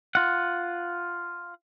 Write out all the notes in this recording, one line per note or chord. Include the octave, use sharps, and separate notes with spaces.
F4 F#5